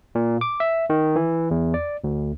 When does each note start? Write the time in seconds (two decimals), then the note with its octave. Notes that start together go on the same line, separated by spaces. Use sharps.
0.15 A#2
0.41 D6
0.60 E5
0.90 D#3
1.16 E3
1.51 E2
1.74 D5
2.04 D2